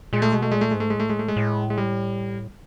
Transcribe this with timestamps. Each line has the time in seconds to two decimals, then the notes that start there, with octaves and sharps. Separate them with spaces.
0.13 A#2 G#3
0.22 A3
0.32 B2 G#3
0.42 A3
0.52 A#2 G#3
0.61 A3
0.71 G#2 G#3
0.80 A3
0.90 G#3
0.95 A2 A3
1.09 G#3
1.19 A3
1.28 G#3
1.37 A2
1.70 G#3
1.78 G3